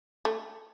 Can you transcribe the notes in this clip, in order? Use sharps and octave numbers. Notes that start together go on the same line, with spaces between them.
A3